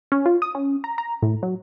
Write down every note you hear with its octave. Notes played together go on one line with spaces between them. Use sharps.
C#4
F4
D#6
C#4
A#5
A#5
A2
F#3